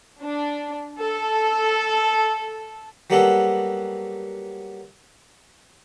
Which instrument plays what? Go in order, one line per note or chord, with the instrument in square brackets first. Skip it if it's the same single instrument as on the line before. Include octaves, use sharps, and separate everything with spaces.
[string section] D4
A4
[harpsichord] F#3 G3 A#3 B3 F#4 A4